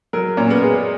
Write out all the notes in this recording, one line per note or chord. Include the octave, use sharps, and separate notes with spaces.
F#3 A#4
A#2 C#4
B3
G#3